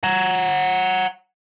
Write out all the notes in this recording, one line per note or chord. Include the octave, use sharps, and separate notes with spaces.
F#5 A#5